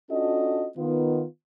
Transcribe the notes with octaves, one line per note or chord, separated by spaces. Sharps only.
C#4 D4 F4 F#4 A4 D#5
D#3 B3 F4